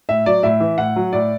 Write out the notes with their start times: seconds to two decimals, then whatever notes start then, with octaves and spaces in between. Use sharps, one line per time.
0.09 A2 E5
0.26 F#3 D5
0.43 A2 E5
0.60 E3
0.78 A2 F#5
0.96 F#3
1.13 A2 D5